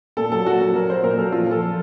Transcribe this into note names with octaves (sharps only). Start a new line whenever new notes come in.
A#2 A4
F#3 A4
F#3 F#4
F#3 A4
F#3 A#4
F#3 C5
A#2 A#4
F#3 A4
F3 F4
F3 A4
F3